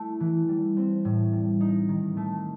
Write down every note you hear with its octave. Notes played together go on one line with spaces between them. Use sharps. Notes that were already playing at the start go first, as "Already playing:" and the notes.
Already playing: A3 E4
E3
G3
C4
A2
G3
D#4
D#3
A3